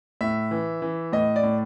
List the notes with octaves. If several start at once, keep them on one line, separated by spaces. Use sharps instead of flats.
A2 E5
E3
E3
A2 D#5
D5
A2